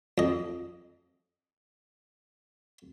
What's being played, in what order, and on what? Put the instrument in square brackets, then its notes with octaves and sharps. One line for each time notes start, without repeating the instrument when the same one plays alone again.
[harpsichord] F2 D#5